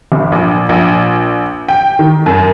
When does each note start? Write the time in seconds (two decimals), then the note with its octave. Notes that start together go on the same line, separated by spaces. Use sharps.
0.12 G1
0.32 A#1
0.69 A#1
1.68 G5
1.99 D#3
2.26 F#2